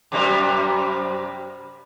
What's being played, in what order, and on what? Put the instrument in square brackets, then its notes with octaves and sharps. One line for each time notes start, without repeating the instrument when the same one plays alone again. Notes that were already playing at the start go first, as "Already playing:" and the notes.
[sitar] F#2 C3 G3